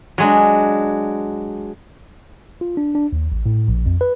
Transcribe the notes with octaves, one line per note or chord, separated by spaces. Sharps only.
F#3 G#3 D4
F4
D4
D4
D#2
A1
A2
A#1
F2
B4